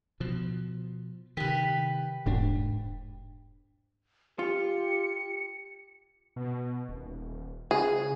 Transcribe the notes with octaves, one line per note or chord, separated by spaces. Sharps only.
B2 F3
C3 D#3 G4 B4
E1 G#2 D4
F4 G4 C#7
B2
D#1
C#3 G#4